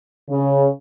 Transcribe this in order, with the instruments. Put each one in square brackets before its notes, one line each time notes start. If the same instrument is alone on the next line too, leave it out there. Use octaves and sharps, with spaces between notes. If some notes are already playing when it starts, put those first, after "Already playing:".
[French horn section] C#3